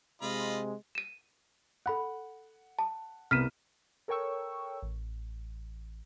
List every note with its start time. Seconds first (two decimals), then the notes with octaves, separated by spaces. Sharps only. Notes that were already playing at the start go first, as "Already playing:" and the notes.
0.22 C3 G#3 F4 D#5 B5
0.95 D#7 E7
1.86 A4 F#5 B5 F#6
2.79 A5
3.31 C2 B3 F6 B6 D#7 E7
4.08 A4 A#4 C#5 G5 C#6 E6
4.82 A1